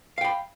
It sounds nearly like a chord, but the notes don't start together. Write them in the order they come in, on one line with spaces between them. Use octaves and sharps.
F5 G5 B5